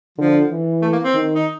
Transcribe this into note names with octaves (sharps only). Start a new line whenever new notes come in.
D3 F3
E3
A3
A#3
C4
D#3
D#4